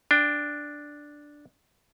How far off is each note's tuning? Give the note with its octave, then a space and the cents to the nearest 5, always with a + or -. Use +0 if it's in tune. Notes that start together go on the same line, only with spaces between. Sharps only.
D4 +0 G5 +25